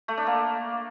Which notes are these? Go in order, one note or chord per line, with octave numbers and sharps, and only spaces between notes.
A3
D4
A#3